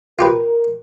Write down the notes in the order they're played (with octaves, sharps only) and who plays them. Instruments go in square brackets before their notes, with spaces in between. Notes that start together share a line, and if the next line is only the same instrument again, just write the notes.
[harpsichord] F4 G4 B4 [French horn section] A#4